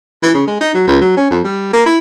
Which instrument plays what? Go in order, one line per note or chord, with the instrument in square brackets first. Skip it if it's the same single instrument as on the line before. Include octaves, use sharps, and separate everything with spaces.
[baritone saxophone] E3
C#3
G#3
D#4
F#3
C#2
F#3
C#4
F2
G3
A#3
E4